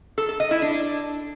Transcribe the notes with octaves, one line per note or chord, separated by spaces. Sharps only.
A4
A4
D#5
E4
D4